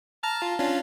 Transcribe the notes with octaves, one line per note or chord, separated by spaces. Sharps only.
A5 A#5 F6
F4
C#4 D4 F4